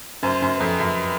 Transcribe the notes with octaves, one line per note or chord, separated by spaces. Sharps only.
F#2 C5
F#2
F2 B4
F#2